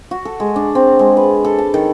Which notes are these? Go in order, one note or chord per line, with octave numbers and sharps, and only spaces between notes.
F#4
A4
G#3
D4
C4
G#3
B4
A4
A5
D#3